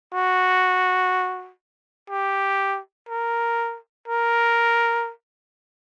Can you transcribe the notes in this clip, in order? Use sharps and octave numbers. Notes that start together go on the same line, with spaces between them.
F#4
G4
A#4
A#4